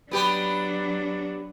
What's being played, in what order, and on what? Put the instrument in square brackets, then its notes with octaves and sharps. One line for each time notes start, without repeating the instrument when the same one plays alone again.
[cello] F#3 D4 [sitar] B3 G4 B4